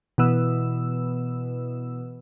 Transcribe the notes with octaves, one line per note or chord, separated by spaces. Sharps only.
B2 E3 B3 E6